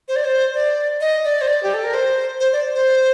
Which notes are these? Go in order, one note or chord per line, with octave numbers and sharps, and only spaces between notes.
C5
D5
C5
D5
D#5
D5
C5
D5
G4
A4
A#4
C5
C5
D5
C5